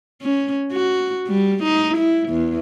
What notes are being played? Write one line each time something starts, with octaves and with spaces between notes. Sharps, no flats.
C#4
F#4
G3
D#4
E4
E2